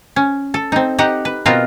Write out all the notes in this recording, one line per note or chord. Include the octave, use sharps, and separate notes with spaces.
C#4
A4
C4 D#4
D#4 G4 F#5
B4
B2 B3 C4 F4 A#4